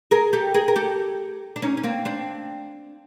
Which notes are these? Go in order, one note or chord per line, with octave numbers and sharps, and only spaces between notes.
G#4 A#4
G4 A4
G#4 A#4
A#4
G4 A4
D4
C#4 D#4
C#4
A#3 C4
C4 D4